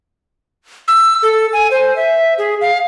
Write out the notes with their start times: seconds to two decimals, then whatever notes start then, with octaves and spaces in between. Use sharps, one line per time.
0.88 E6
1.23 A4
1.53 G#5
1.71 C5
1.96 E5
2.38 G#4
2.61 F5